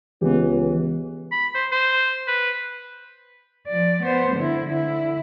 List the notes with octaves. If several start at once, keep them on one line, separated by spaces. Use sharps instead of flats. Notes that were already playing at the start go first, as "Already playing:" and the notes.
C#2 E3 B3 G4
B5
C5
C5
B4
F3 D5
B3 C5
D3 E4
D3 E4